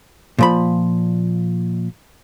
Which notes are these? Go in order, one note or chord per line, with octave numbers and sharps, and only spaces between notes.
A#2 F3 B5